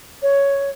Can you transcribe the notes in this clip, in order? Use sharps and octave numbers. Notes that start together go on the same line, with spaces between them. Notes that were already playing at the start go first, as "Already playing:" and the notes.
C#5